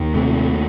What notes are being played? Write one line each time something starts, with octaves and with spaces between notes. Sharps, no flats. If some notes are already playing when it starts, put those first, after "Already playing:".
Already playing: D#2
C3 A3